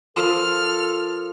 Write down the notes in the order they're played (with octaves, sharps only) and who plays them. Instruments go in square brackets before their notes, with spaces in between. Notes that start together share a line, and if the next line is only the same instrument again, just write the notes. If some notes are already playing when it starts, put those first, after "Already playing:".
[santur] F3 F4 A#4 [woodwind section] A4 [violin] F6